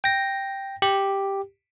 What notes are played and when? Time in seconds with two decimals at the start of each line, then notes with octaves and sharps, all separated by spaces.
0.04 G5 A#6
0.82 G4